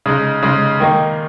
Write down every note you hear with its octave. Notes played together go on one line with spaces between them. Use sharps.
C#3 G#3 D#4
C#3 G#3 D#4
D#3 A#3 D#4